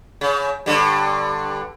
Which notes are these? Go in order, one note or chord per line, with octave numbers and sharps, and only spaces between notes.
C#3
G2 D3